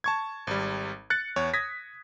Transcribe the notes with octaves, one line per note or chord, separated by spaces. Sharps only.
A5 C#6 G#6
G#1 G3
F#6 A6 C#7
E2 C#5
D#6 G#6 A#6 B6